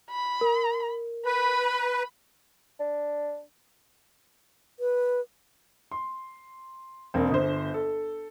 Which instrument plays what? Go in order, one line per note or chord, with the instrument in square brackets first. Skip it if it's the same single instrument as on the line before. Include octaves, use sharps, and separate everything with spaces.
[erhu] B5
[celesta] A#4
[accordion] B4 [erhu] B5
[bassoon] D4
[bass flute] B4
[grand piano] C6
E1 A#3 C4
G1 C5
A4